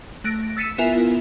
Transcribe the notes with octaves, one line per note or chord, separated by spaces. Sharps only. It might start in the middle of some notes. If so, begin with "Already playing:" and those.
A3 F#6 A#6 D7
E6 A6 B6 C#7 D#7 E7
B3 E4 F4 A#4 E5 G#5